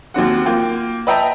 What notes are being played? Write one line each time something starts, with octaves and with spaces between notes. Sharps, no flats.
D#2 F#3 C4 F#5
A#3 F4 G5
B4 D#5 E5 G5 A5 A#5